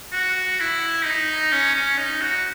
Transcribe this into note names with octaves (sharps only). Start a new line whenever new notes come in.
F#4
E4
D#4
C#4
C#4
D#4
F#4